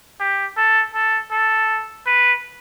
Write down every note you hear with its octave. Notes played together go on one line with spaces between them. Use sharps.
G4
A4
A4
A4
B4